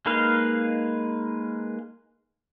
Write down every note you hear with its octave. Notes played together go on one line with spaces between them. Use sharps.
G#3 A#3 D#4 B4 F5